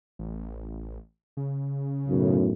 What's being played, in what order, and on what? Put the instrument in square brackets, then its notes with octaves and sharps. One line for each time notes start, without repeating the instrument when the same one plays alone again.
[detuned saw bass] A1
C#3
[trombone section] B1 F#2 A2